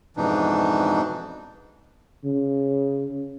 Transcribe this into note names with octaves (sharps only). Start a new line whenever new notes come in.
F2 G#2 B2 E3 D4 D#4
C#3